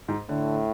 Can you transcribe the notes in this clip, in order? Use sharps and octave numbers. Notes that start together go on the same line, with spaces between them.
G#2
A2 D3